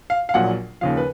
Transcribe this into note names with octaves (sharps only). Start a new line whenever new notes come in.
F5
F5
A#1 A#2 F#3 F#5
D#2 C#3 F3 F5
B4